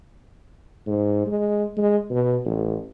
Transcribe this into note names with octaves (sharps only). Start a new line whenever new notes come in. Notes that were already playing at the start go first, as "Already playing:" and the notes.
G#2
G#3
G#3
B2
A1